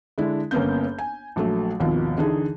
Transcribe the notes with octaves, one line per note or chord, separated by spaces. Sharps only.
D3 G#3 D4 E4
G1 A#3 B3 C#4 G6
G#5
A#1 F#3 A3
G#1 D#2 B2 F3
D3 E3 D#4 G#4